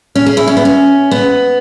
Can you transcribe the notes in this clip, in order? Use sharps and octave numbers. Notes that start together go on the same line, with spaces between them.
C#4
G#4
E4
C#4
B3
C#4
B3